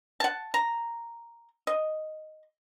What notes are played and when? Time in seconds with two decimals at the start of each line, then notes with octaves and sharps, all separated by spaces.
0.20 F#5 A5
0.54 A#5
1.67 D#5